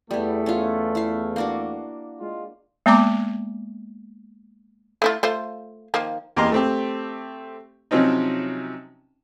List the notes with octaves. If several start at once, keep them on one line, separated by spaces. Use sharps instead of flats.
E2 G3 A3 B3
C#4 F4
E4 F5
A#3 D4 F#4
G#3 F4
G#3 A#3 B3 D5 A#5 D6
A3 E4 F4
A3 F4 C5
D#3 F3 A#3
E2 A#3 G4 D#5 A#5 C6
A3 C4 G4
C3 F3 F#3 C4 C#4 D#4